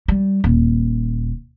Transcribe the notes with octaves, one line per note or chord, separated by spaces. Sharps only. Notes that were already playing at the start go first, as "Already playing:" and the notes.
G3
D#1